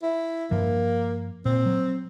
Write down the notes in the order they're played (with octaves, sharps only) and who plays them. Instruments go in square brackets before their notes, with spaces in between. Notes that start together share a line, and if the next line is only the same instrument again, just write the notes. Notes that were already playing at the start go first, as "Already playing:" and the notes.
[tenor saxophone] E4
[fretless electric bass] G2 F3 [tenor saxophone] A#3
[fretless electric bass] A#2 [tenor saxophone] C4
[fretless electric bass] F#3